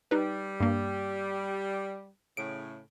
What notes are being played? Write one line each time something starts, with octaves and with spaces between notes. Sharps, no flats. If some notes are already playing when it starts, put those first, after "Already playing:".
G3 D#4 B4
G2 A#3
A2 C#3 D7